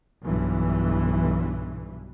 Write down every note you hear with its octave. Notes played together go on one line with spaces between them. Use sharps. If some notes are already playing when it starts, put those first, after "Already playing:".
B1 G2 E3